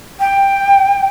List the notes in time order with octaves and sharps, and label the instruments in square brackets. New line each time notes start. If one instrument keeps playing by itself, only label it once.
[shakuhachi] G5